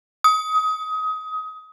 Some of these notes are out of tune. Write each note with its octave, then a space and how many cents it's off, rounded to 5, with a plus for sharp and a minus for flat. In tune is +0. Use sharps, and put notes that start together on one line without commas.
D#6 +25